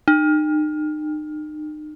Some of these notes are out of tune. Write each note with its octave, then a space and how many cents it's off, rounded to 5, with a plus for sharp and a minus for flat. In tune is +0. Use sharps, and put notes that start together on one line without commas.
D#4 -35